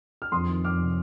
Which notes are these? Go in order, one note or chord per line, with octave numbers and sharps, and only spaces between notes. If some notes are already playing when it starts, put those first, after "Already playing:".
F6
F2 C6 D#6
D#3
F2 D6 F6
C3